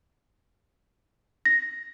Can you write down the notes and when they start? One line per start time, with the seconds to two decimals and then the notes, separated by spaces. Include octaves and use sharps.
1.45 A#6